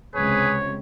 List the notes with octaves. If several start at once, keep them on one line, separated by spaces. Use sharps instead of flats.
C#2 C3 G#4 B4 C#5